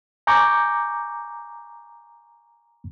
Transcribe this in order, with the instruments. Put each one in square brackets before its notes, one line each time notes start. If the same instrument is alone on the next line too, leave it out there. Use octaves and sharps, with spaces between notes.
[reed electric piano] G#5 A#5 C#6 D6 G6